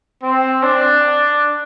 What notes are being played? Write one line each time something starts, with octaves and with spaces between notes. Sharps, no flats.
C4
D4